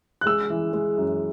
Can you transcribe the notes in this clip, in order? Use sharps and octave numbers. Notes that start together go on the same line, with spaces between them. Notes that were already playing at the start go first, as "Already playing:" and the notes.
F#6
G#3 E6
E3
G#3
F#2